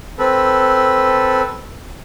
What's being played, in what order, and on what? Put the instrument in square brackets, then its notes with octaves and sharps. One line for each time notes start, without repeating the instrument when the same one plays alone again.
[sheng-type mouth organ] C4 A4 B4